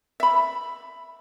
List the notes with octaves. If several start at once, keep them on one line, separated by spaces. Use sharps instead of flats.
E5 B5